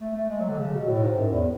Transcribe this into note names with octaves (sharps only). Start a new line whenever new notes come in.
A3
A3
G#3
F#3
D3
C#3
B2
A2
G#2
F#2
E2